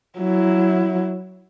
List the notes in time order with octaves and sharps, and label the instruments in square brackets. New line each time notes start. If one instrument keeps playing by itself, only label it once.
[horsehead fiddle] F#3 E4